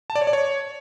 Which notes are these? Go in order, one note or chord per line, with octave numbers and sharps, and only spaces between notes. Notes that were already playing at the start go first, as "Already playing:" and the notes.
A5
D5
C#5
D5
C#5